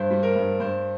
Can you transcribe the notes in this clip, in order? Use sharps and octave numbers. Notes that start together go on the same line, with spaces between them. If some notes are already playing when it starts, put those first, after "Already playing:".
Already playing: G2 C5
G3
A#4
G2
G2 C5